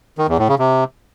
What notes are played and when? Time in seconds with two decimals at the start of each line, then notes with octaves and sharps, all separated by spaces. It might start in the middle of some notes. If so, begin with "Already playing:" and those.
0.18 D#3
0.28 E2
0.38 A2
0.48 C#3
0.59 C3